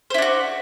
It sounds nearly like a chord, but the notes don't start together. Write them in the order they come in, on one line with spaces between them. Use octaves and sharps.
C5 E4 D4 F#4